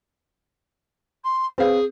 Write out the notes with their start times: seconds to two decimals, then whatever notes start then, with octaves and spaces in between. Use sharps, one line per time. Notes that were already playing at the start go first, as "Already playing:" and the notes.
1.24 C6
1.58 C4 G#4 B4 F5